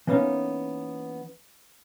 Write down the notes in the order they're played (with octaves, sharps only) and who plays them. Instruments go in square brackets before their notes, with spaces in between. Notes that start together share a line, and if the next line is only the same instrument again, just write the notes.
[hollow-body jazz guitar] E3 A#3 B3 C#4 D#4